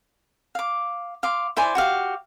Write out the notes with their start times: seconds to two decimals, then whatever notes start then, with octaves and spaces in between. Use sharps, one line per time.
0.55 F5 D6
1.23 F5 C6 D6
1.57 E4 C5 D5 G#5
1.75 F#4 G4 F5